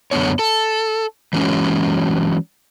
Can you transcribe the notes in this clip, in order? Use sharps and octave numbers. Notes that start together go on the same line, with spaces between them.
F#2 D3 B3 C#5
A4
E3 F#3 G#3 C#4